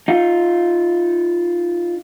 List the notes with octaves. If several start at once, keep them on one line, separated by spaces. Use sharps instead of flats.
D#4 F4